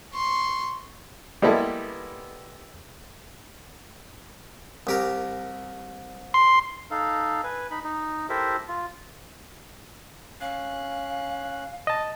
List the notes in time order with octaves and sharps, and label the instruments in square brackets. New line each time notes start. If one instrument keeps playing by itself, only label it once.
[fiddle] C6 C#6
[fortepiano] G3 G#3 A#3 B3 E4 A4
[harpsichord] C2 G4 A#4
[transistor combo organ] C6
[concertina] D#4 A4 F5
B4 G#5
D#4 B5
D#4
E4 G4 A4 A#4 C5 E5
F4
[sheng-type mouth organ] C#4 F#6 [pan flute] F5
[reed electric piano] D#5 A5